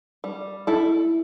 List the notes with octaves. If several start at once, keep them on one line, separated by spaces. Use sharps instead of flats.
G3
E4 A4